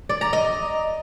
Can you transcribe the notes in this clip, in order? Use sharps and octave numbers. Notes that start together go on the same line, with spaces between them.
D5
A#5
D#5